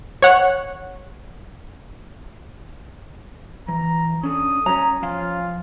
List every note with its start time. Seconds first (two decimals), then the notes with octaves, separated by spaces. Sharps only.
0.22 C#5 F#5
3.68 E3 A#5
4.23 C#4 D4 A4 D#6
4.66 C#4 C#5 A#5
5.02 F3 F4 F5 G#5